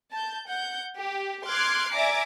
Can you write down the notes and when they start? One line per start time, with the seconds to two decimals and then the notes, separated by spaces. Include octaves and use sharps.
0.13 A5 G6
0.48 F#5 G6
0.98 G4
1.48 C6 D6 F6 F#6 G#6 C7
1.93 D5 E5 G#5 A#5 D6